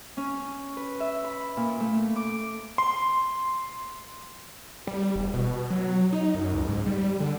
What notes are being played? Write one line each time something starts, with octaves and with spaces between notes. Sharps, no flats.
C#4
B4
E5
B5
A#2
A3
D6
C6
G3
E1
B2
F#3
D#4
F#2
C#2
G#2
G3
D3